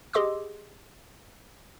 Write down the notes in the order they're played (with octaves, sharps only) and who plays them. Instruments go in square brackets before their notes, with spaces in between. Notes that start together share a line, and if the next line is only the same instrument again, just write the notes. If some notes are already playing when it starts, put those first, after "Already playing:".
[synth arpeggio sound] G4 G#4 D#5 C6 D6 E6